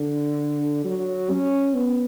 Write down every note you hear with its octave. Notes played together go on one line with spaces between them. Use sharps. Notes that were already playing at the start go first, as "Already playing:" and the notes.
Already playing: D3
F#3
C#4
B3